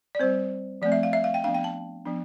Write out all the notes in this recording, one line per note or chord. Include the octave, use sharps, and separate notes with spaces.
D5
G3 C4 C5
F3 A3 C4 D5
E5
F5
E5
F5
G5
F3 B3 D4 F5
G5
A5
F3 B3 D4